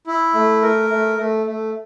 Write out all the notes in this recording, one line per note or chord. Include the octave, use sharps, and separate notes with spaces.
E4
A3
A#4
A3
A3
A3